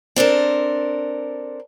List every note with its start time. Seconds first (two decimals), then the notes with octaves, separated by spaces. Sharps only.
0.16 C4 D4 A4 A#4